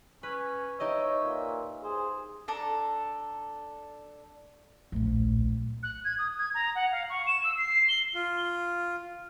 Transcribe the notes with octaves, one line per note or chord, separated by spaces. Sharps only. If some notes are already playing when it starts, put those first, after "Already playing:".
C#4 B4
D#4 G4 C#5 D#5 E5
A#2
G#4 C5
D4 A4 A#5
D1 A#1
F#6
G#6
D#6
G#6
A#5
F#5
F5
C#6
E7
E6
C7
G7
F4